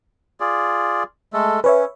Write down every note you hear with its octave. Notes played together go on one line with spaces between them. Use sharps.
F4 G#4 D5
G#3 A3 A4
C#4 B4 C#5 E5